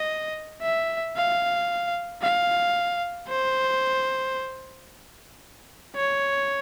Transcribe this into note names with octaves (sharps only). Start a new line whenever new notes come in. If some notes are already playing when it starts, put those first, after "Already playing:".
Already playing: D#5
E5
F5
F5
C5
C#5